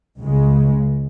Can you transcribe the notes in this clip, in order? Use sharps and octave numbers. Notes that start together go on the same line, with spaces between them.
C#2 C#3 G#3